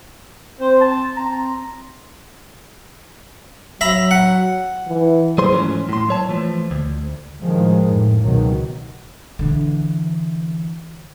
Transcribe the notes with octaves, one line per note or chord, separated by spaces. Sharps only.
C4 C5
A5
C4 A#5
F#3 E5 A#5 B5
F#5
E3
F#3 G#4 C5 C6
G#2 E3 F3 A3 C#4
A2 C6
F#3 C#5 A5
E3 F3 A3
D2
A2 D#3 F3 G#3
F2 A2
C#2 B2 D#3 F#3
D3 E3